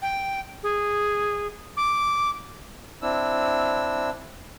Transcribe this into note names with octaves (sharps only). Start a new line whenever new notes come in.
G5
G#4
D6
C4 D4 E4 E6